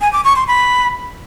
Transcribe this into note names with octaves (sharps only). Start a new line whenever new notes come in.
G#5
D6
C#6
C6
B5